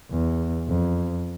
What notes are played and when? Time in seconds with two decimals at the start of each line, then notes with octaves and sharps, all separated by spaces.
0.12 E2
0.68 F2